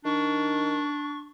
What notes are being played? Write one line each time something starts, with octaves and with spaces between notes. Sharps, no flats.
D#3 D4 C#6